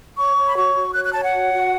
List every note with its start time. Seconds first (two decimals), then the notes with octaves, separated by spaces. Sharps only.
0.17 C#5 C#6
0.37 C#5
0.46 B5
0.56 F#4 C#6
0.75 F#4
0.94 C#5 F#6
1.04 F#6
1.13 C#5 A5
1.24 F#5
1.33 F#4
1.52 F#4